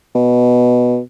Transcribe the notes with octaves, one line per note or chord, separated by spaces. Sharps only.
B2